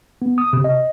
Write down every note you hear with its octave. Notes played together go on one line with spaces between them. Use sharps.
B3
D#6
C3
D#5